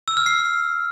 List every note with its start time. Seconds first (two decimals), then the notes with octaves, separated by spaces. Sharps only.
0.08 E6
0.17 F6
0.26 C7